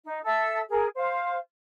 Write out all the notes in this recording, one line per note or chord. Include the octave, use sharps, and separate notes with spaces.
D#4
A4 E5 E6
G#4 A#4
C5 F5